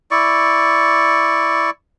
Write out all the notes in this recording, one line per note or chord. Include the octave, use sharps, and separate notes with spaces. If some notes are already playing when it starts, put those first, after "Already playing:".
E4 D5 C#6